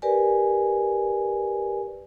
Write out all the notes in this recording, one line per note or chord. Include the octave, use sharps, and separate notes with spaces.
G4 A#4 B4 D5 G#5